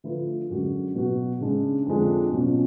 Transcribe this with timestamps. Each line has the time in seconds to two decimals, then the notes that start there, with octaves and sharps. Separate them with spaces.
0.04 D3 F3 A3 F4 B4
0.50 F#2 D3 G#3 C#4 F#4
0.95 B2 F#3 B3 F#4
1.40 C#3 G#3 D4
1.87 F2 D3 F3 G#3 D4
2.32 B2 F#3 C#4 F4